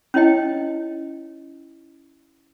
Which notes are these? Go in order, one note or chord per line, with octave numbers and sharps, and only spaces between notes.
C#4 D#4 E4 C#5 D#5 G5